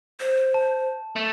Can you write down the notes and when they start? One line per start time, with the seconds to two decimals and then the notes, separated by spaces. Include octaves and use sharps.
0.20 C5
0.54 A5
1.16 A3